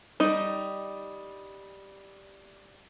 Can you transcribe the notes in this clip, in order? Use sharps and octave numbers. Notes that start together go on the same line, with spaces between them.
G3 D#4